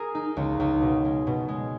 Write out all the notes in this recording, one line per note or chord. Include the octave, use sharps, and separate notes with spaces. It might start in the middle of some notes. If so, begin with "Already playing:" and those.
Already playing: G#4 A#4
D#4
C#2
C#2
B2
G#3
B2
G#3